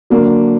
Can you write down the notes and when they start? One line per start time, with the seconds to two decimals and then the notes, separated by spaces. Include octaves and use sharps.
0.10 D3 F#3 A#3 D4